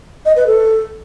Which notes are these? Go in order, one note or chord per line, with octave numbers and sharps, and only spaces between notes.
D#5
B4
A4